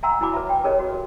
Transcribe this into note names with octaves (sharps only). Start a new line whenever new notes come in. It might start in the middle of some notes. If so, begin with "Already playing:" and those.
E5 F#5 G#5 A#5 C6 E6
E4 F#4 G#5 B5 D6
B4 E5
G5
G4 G#4 A#4 B4 C#5 D#5
F#4